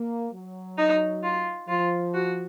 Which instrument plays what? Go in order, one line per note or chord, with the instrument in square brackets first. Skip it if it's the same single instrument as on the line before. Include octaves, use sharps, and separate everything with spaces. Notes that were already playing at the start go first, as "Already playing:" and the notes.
Already playing: [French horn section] A#3
F#3
[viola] D#4
F4
[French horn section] F3 [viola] F4
[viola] F#4